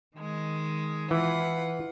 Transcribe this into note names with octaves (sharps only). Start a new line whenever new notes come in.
D#3 G#3
E3 F4 B4 F#5